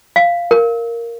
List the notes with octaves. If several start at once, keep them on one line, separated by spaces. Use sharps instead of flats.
F5
A#4